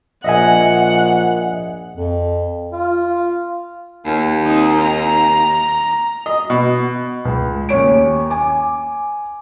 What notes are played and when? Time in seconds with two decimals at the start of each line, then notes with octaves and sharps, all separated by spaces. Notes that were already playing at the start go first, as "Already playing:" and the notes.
0.24 A#1 D#5 E5 F#5 G#5
1.96 F2
2.72 F4
4.05 D#2
4.45 C4 D#4
4.82 A#5
6.26 D#5
6.50 B2
7.25 C#2
7.69 D#2 C#4 C#5 D7
8.30 G#5 D6